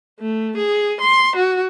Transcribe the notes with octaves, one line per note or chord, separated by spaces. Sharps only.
A3
G#4
C6
F#4